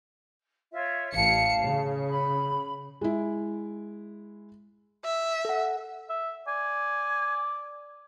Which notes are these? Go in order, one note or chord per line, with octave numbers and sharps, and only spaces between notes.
F4 C#5 E5
A1 F5 A5 C#7
C#3
B5
G#3 E4
E5
A4 F#5
E5
D5 G#5